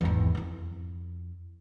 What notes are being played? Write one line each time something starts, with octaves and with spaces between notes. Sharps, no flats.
G#1 E2
F2 E4